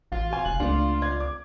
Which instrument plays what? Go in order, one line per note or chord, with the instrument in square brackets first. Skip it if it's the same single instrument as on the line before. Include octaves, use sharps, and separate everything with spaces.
[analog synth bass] A1 [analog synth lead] F4
[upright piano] F#4 G#5
[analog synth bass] F1 [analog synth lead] F#6
[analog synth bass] C#2 [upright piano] A3 D4 [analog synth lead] F4
[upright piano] D5 G#6
D6